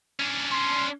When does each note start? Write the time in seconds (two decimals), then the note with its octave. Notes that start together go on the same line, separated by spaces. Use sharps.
0.20 C#4 D4
0.51 C6